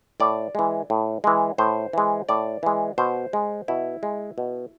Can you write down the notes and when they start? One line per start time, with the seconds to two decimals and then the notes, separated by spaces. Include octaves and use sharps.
0.20 A2 D5
0.55 E3 G#3
0.90 A2
1.24 E3 G#3
1.58 A2 C5
1.93 E3 G#3
2.29 A2 D5
2.63 E3 G#3
2.98 B2 C5
3.33 G#3
3.68 B2 E4
4.03 G#3
4.38 B2